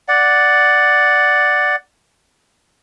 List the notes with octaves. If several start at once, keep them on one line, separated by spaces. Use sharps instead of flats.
D5 F#5